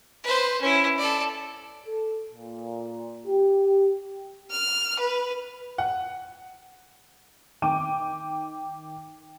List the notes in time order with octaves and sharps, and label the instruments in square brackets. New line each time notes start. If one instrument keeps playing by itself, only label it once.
[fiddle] B4 C5
C#4 E4
A4 D5
[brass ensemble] A4
A#2
G4
[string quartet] F6
B4
[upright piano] F#5
[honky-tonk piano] D#3 G5 D6 D#7